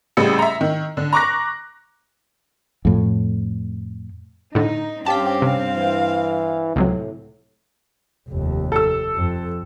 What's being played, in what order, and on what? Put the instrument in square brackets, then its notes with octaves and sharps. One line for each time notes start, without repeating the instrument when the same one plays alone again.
[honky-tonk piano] A1 A2 C#3 G3 E6 C#7
E5 A#5
D#3
D3
A#5 C#6 D6 F#6 A#6
[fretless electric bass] F2 A2
[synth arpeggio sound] A2 D3 [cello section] D#4
[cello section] G2 C4 [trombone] C#4 [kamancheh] G4 F5 [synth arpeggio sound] A5 B6
[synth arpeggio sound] C3 [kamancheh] F5
[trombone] E3
[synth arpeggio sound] C#2 C3 F#3 [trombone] A2
[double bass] F1 D#2
[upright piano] A4 E6
[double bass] F2